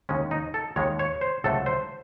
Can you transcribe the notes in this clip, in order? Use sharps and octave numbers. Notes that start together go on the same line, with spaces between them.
D#2 D#3 G#3 C#4
D#4
A4
D#2 D#3 G#3 C#5
C#5
C5
C#2 C3 F#3 A3 A4
C5